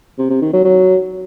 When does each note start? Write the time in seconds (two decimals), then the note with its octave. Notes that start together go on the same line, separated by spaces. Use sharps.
0.18 C3
0.30 C3
0.41 D#3
0.53 F#3
0.65 F#3